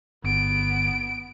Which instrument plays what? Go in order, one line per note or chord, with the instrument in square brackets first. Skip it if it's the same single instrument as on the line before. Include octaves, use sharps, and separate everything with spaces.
[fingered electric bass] G1 [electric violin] B3 D7